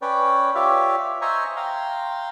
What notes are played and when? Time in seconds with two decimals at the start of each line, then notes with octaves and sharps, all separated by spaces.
0.02 C#4 B4 C#5 D5 G5
0.55 F4 G4 C#5 D5 E5 F5
1.22 C5 D#5 E5 G#5 A#5 C#6
1.56 F5 G5 A#5 C6